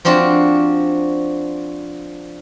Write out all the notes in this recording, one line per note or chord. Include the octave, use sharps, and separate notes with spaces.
F3 C4 D4 F#4